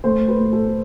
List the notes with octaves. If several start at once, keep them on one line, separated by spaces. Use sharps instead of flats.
A3 C5
B4
A2
A4